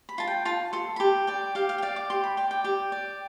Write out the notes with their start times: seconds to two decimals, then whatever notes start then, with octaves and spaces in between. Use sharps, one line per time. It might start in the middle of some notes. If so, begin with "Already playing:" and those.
0.09 B5
0.18 F4 A5
0.27 G5
0.45 F4 A5
0.73 A4 C6
0.96 B5
1.00 G4 A5
1.27 D5 G5
1.55 G4 F5
1.69 F5
1.78 G5
1.82 D5 F5
1.96 D6
2.10 G4 C6
2.24 B5
2.37 D5 G5
2.51 G5
2.64 G4
2.92 D5